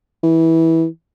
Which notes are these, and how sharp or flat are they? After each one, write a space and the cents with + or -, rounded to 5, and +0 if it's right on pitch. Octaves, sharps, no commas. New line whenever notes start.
E3 -15